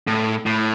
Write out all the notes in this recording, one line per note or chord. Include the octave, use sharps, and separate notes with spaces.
A2
A2